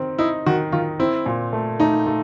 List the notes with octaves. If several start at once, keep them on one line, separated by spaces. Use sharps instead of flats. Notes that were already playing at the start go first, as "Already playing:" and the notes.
Already playing: D#3 C4
D#4 E4
D#3 F#4
D#3 F4
C4 E4
A#2
A3
A3 D#4
A3